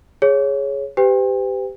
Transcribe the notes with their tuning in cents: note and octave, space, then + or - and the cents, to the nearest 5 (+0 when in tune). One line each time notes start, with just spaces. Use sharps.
G#4 +0 C#5 +0
G4 +0 B4 +45 G5 +35